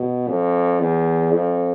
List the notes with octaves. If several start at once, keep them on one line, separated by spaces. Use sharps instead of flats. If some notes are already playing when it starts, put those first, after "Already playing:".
Already playing: B2
F2
E2
F2